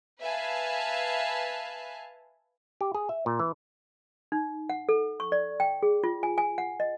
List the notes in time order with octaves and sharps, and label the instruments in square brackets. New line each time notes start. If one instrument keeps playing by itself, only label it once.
[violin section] B4 E5 F5 G#5 A5
[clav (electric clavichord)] G4
G#4
E5
A#2
E3
[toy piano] D#4
F#5
A4
C#6
D5
G5
G#4
F4
G#5
G#5
F#5
D#5